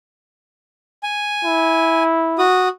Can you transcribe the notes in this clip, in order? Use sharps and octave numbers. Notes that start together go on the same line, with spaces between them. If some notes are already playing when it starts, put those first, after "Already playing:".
G#5
E4
F#4 D#6